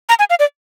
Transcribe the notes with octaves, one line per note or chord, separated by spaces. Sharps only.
A#5
G#5
F5
D5